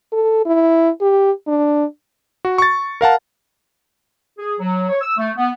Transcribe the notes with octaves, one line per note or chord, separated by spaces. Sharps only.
A4
E4
G4
D4
F#4
C#6 A6
A#4 F5 F#5 A5
G#4
F#3
C#5
E6
A3
B3